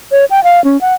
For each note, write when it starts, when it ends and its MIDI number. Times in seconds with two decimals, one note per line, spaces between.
0.12 0.25 73
0.31 0.43 79
0.44 0.63 77
0.64 0.79 61
0.81 0.94 78